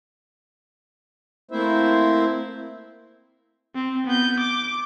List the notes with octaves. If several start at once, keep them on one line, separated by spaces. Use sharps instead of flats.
A3 A#3 C4 E4 C5 E5
C4
B3 G6
D6